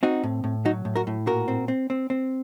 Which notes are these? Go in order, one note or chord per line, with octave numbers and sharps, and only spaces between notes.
C4 D#4 F#4
A2
A2
F#3 D#4 F#4
A2
F#4 A#4
A2
A#2 F#4 A#4
C4
C4
C4
C4